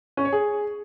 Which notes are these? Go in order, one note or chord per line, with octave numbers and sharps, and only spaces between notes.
C#4
C#5
G#4